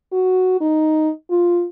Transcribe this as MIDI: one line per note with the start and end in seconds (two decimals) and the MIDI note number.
0.13 0.56 66
0.61 1.09 63
1.31 1.66 65